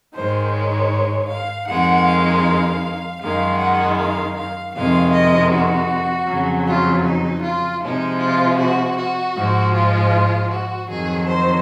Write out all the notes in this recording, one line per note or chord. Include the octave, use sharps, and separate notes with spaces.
G#2 D#3 G#3 C5
C#5
F5
F2 D#3 G#3 F#5
F5
F#2 D#3 G#3 F5
F#5
F5
F5
F2 C3 D#3 G#3 F5
D#5
F#4
F2 C#3 F#3
F4
D#4
F4
C3 F3 G#3 D#4
F4
F#4
F#4
G#2 F3 G#3
F4
F#4
F2 D#3 F#3 G#4
C5